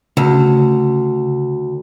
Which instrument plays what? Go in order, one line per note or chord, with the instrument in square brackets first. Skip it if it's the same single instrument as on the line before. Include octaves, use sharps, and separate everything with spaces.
[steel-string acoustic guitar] D2 [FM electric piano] C#3